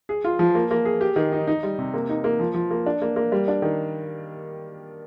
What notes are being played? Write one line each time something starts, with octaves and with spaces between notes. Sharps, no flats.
G#4
F4
F3
A#3
A#3
G#4
G4
D#3
D#4
D#4
G3
C3
A#3
D#4
A#3
F3
F3
A#3
D4
A#3
A#3
G3
D4
D#3